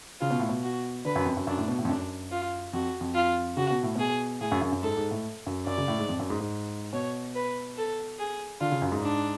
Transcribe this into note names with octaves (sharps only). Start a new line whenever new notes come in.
C#3 F4
B2
A2
B2
F#4
D3 B4
F#2
F2
F#2
F#2 D4
A2
B2
A2
F2
F#2 D4
F4
F2 F#4
F2
F4
C#3 F#4
B2
A2
B2 G#4
A2 G#4
F#2
F#2
F#2
G#2 A4
G#2
A2
F#2
F#2 D5
C#3
A2
G#2
F2
F#2
G#2
G#2
B2 C#5
B4
A4
G#4
D3 F4
C#3
F#2
G#2
D4